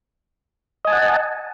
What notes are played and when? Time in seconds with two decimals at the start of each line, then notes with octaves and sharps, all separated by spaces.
0.85 D#5
0.87 G#5
0.90 A5
0.93 F#5